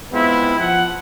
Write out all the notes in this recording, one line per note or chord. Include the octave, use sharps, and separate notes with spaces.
G#3 B3 C4 E4 F4
F3 F#5